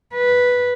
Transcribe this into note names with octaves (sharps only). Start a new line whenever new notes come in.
B4